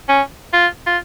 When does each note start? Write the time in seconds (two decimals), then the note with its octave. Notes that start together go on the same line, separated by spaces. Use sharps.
0.08 C#4
0.53 F4
0.86 F4